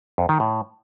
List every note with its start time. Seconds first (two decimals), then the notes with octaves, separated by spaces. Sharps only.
0.18 F2
0.29 D#3
0.40 A2